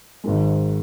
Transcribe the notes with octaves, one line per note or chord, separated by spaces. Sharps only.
G#1 G#2 D#3 G#3